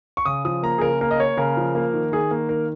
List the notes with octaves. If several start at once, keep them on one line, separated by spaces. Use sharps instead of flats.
C#6
C#3 D#6
F3 D#6
A#3 A#5
G#4
C#3 A#4
A#3 A#4
D#5
A#3 C#5
C#3 A#4
F3
A#3
D#3
D#3 G#4
A#3
D#3 A#4